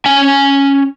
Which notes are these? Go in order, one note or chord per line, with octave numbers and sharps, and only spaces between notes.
C#4 G#5